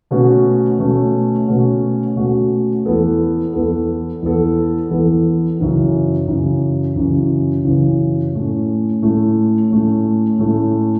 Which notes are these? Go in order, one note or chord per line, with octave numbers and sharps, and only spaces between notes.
B2 A3 C#4 F#4
B2 A3 C#4 F#4
B2 A3 C#4 F#4
B2 A3 C#4 F#4
E2 E3 B3 A4
E2 E3 B3 A4
E2 E3 B3 A4
E2 E3 B3 A4
F#2 C#3 E3
F#2 C#3 E3
F#2 C#3 E3
F#2 C#3 E3
A2 A3 C#4
A2 A3 C#4
A2 A3 C#4
A2 A3 C#4